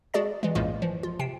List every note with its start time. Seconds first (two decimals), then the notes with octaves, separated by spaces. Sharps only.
0.14 G#3 F#4 G#4 D5 A5 A6
0.43 E3 G#3
0.55 A#1 F#2 A2 G#3 A#3 F4
0.82 E3 F3
1.03 F4
1.19 C3 G5 C7 E7